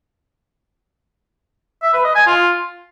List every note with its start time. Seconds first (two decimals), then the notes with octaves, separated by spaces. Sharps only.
1.82 E5
1.93 B4
2.04 D#5
2.15 G#5
2.26 F4